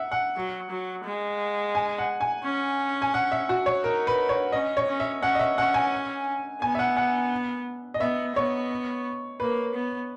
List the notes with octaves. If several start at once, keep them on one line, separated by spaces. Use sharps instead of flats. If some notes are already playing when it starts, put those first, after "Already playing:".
Already playing: E5 F#5
F#5
F#3
F#3
G#3
G#5
F#5
G#5
C#4
G#5
F#5
E5
F#4
C#5
D#4 A#4
B4
C#5
C#4 D#5
C#5
C#4
E5
C#4 F#5
D#5
E5
C#4 F#5
G#5
B3 G#5
E5
F#5
F#5
D#5
B3 E5
B3 C#5
A#3 B4
B3